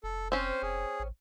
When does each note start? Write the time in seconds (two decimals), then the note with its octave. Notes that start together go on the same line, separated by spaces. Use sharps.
0.04 F1 A4
0.32 C4 C#4 C5
0.62 F1 G#4
1.00 A1